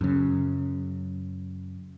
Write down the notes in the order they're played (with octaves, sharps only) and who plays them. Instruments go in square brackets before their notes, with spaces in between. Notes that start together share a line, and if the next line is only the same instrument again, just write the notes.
[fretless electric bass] F#2 C#3